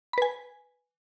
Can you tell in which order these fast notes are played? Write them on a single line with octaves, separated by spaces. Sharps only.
B5 B4 G#5